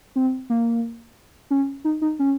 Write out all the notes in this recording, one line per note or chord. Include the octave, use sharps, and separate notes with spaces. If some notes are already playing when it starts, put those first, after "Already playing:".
C4
A#3
C#4
D#4
D#4
C#4